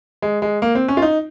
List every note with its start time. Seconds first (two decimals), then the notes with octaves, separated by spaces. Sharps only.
0.22 G#3
0.42 G#3
0.62 A#3
0.75 C4
0.88 C#4
0.97 F4
1.02 D#4